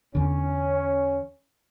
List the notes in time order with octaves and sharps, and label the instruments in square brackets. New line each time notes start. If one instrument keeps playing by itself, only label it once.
[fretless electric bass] E2 D3 [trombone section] C#4